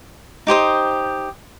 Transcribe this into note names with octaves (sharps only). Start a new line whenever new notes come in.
D#4 G4 C5 D#6